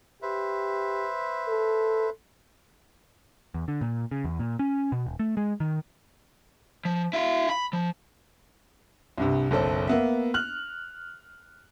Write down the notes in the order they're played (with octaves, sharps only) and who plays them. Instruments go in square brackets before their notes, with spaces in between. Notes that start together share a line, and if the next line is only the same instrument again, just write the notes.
[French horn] G4 [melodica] B4 C5 E5
[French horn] A4
[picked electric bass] E2
D3
A#2
C#3
E2
A#2
C#4
B2
D#1
A3
G#3
D#3
[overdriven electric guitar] F3
E4 F5
B5
F3
[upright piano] C2 G2 C3
F#1 B1 A4 C5
A#3 B3 E5
F6 F#6 F#7